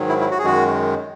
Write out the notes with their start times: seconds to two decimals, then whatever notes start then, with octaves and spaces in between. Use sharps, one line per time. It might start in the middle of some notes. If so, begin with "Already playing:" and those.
Already playing: G#2 D#3 F#3
0.09 E4
0.20 E4
0.31 F#4
0.39 G#4
0.42 F#2 D#3 G#3 F#4